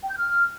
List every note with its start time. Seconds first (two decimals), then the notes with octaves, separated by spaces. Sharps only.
0.03 G5
0.10 G6
0.17 F6